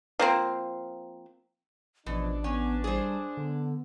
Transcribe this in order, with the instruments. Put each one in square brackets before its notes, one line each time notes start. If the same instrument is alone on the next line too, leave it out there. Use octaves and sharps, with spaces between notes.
[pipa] F3 A#3 C4
[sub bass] A1 [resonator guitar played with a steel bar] B2 [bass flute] F3 [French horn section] D4
[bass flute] B3 [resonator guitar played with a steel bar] C#4
[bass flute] G3 [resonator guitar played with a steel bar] G#4 C5
[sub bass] D3 [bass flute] B3